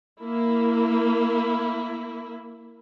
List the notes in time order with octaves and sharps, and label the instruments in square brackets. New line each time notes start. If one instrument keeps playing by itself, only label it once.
[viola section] A#3 E4